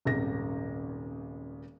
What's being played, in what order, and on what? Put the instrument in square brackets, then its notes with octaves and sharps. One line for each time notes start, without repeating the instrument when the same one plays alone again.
[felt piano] D#1 G#1 C#3 A#6